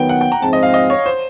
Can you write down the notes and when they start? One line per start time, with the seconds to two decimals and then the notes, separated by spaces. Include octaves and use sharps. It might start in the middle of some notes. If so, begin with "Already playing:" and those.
Already playing: D#3 F#3 B3 G5
0.09 F#5
0.21 G5
0.32 A#5
0.42 G#2 F3 G#3 C4 A5
0.53 D#5
0.63 F5
0.74 D#5
0.90 C#5
1.06 C5